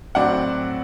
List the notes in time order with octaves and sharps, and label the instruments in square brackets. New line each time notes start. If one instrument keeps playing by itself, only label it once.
[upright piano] A2 F#3 C4 D5 F#5